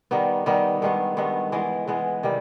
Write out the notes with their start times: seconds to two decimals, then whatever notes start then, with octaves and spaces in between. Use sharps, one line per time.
0.11 D#3 G3 B3 D#4
0.46 D#3 G3 B3 D#4
0.82 G2 D#3 G#3 B3
1.17 G2 D#3 G#3 B3
1.52 E3 G#3 B3
1.88 E3 G#3 B3
2.23 C3 D#3 G3